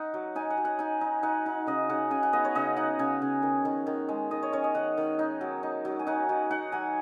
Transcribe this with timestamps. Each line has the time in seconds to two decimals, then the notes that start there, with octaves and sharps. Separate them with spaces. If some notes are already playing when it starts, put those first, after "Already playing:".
Already playing: D#4 F#5
0.14 F#3
0.35 D#4 G#5
0.50 F#5
0.57 F#3
0.65 F#5
0.79 D#4 G#5
1.01 D#4
1.23 D#4 F#5
1.46 D#4
1.67 C#3 D#5
1.89 C#3 F#5
2.11 C#3 G#5
2.23 F#5
2.33 B3 D#5
2.45 C#5
2.55 C#3 D#5
2.76 D#4 F#5
2.99 C#3 G#5
3.22 C#3
3.42 D#3
3.65 D#3
3.87 D#3
4.08 G#3
4.31 D#3 D#5
4.42 C#5
4.52 C#4 C#5
4.64 D#5
4.75 D#3 F#5
4.97 D#3
5.19 D#4
5.41 F#3
5.63 D#4
5.85 F#3
5.99 G#5
6.07 D#4 F#5
6.29 F#3
6.50 D#4 F#5
6.72 F#3 G#5